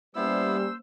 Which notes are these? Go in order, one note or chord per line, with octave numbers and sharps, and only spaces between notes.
G3 A#3 B3 C#4 E4 C5 E6